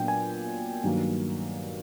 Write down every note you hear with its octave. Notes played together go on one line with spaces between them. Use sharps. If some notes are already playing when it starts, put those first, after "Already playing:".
Already playing: A#2 F#3 B3 D4 G5
G#5
G2 D#3 F#3 A#3